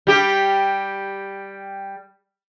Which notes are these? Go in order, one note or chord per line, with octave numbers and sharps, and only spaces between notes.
G3 G4